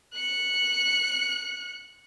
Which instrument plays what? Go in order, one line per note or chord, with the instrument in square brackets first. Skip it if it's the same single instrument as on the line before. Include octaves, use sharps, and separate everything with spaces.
[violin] F#6 C#7